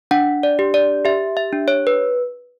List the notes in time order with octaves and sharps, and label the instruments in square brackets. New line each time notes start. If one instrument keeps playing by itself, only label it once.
[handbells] D4 F#5
D5
G4
D5
G4 E5
E5
D4
C#5
B4